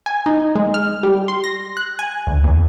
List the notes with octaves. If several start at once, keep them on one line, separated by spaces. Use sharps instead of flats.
G#5
D#4
G#3
F6
G3
C6
A#6
F#6
G#5
D2
E2